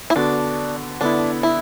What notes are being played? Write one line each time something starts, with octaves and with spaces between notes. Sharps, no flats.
E4
D3 B3 D4 F#4
D3 B3 D4 E4
E4